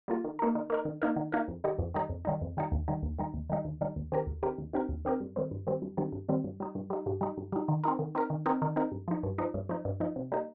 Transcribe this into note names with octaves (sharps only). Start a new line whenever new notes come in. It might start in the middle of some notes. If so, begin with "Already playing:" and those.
G3 A#3 F4
D#3
A#3 D#4 A#4
D#3
A#3 D#4 A#4
D#3
A#3 D#4 A#4
D#3
A#3 D#4 A#4
F2
D#3 G3 D#4
F2
D#3 G3 D#4
F2
D#3 G3 D#4
F2
D#3 G3 D#4
D#2
D#3 G3 D#4
D#2
D#3 G3 D#4
D#2
D#3 G3 D#4
D#2
D#3 G3 D#4
D#2
D#3 C4 G4 A#4
D#2
D#3 C4 G4 A#4
D#2
D#3 C4 G4 A#4
D#2
D#3 C4 G4 A#4
G2
D#3 G3 C4
G2
D#3 G3 C4
G2
D#3 G3 C4
G2
D#3 G3 C4
G2
G3 D#4
G2
G3 D#4
G2
G3 D#4
G2
G3 D#4
D#3
C4 D#4 A#4
D#3
C4 D#4 A#4
D#3
C4 D#4 A#4
D#3
C4 D#4 A#4
G2
F3 D#4
G2
F3 D#4
G2
F3 D#4
G2
F3 D#4
C3
G3 A#3 D#4